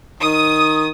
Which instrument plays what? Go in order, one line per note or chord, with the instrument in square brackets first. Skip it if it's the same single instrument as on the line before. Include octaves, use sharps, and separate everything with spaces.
[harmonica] D#3 [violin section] D#6